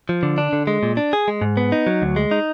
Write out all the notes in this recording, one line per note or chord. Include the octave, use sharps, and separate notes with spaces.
F3
D3
D4
D3
G#3
A#2
D4
G#4
G#3
G#2
B3
D#4
F#3
D2
G#3
D#4